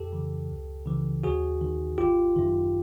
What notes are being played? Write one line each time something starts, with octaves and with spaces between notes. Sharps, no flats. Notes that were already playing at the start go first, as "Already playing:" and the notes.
Already playing: F2 G4 A4
C#3 E3
C#2
C#3 E3
D#2 F#4 G#4
D#3
G#1 F4 G4
F#2 D#3